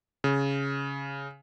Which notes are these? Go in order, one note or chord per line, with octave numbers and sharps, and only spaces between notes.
C#3